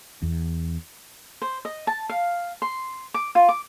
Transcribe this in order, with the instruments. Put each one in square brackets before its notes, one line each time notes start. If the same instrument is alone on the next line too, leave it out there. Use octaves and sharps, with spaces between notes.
[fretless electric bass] E2
[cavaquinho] C5
D#5
A5
F5
C6
D6
F4
D6